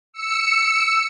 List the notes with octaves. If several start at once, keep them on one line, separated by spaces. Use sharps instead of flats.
E6 C#7